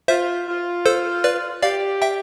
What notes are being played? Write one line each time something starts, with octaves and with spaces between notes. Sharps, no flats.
F4 C5 E5
F4
A4 C5
B4 D5
G4 D5 F5
E5 G5